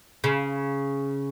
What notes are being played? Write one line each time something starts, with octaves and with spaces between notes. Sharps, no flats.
C#3